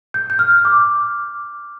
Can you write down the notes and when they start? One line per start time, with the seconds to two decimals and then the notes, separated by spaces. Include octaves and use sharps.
0.14 G6
0.30 G6
0.39 F6
0.65 D6